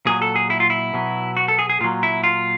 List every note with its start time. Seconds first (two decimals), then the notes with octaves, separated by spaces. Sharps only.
0.06 A#2 F#3 G#4
0.22 A4
0.36 G#4
0.50 E4
0.60 F4
0.70 E4
0.94 B2 F#3
1.37 F#4
1.48 A4
1.59 G#4
1.69 G#4
1.80 A#2 F#3 F4
2.03 E4
2.24 F4